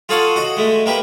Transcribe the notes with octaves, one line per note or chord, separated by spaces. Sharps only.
F4 G#4 A4 C#5 F5 F#5
F#4 D#5
G#3 A3
A#3 G4 B4